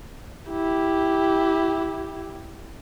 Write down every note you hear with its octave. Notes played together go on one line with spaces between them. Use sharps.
E4 G4